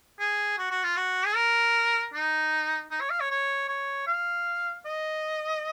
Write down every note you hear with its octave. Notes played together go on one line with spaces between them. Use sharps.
G#4
F#4
F#4
F4
F#4
G#4
A#4
D#4
D#4
C#5
F5
C#5
C#5
C#5
F5
D#5